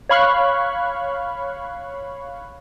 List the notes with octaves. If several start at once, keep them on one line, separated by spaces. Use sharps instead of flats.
C#5 F5 B5 C#6 F6 F#6